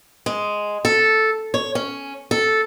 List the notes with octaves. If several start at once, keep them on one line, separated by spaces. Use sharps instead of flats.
G#3
A4
C#5
C#4
A4